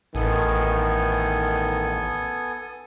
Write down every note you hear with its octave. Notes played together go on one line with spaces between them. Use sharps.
A1 D#3 B3 A4 G#5